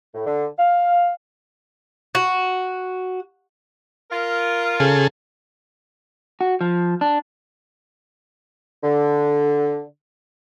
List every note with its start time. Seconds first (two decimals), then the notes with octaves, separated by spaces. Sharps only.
0.14 A2
0.26 D3
0.58 F5
2.15 F#4
4.11 F4 A#4
4.80 C#3 G#4 A4
6.41 F#4
6.61 F3
7.01 D4
8.83 D3